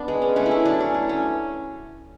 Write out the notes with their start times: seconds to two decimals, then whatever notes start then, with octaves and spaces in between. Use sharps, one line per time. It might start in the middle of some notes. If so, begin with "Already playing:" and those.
Already playing: B3 D4
0.08 G#3
0.22 C#4
0.36 A3 C#4
0.46 E4
0.51 C#4 D4
0.66 F#3 D4
0.81 C#4
0.94 A3
1.09 C#4